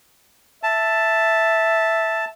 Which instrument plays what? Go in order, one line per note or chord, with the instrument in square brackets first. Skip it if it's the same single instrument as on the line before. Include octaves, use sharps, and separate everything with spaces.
[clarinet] E5 [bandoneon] A5